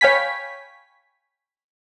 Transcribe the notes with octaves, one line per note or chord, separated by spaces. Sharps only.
C#5 F5 G5 G#5 B5 B6